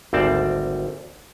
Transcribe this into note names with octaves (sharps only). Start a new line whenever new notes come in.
G#1 D2 G3 C4 D5 A5